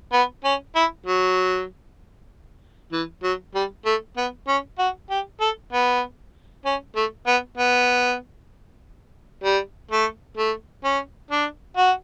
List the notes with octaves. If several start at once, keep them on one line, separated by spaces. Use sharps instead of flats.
B3
C#4
E4
F#3
E3
F#3
G3
A3
B3
C#4
F#4
G4
A4
B3
C#4
A3
B3
B3
G3
A3
A3
C#4
D4
F#4